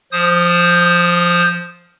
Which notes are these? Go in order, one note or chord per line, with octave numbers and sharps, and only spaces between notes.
F3 C5 D#6